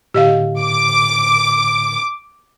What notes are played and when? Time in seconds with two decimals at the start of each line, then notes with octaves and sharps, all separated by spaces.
0.14 A2 D3 G4 D#5 F5
0.61 D6